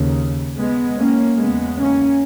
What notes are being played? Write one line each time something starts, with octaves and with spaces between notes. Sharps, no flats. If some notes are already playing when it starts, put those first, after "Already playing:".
Already playing: D#2 C#3
G#3 B3
A#3 C#4
E2 C#3 G#3 B3
A#3 C#4